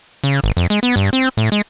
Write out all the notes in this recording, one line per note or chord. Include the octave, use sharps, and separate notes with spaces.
C#3
G#1
F2
G#3
B3
G2
C4
A2
G#3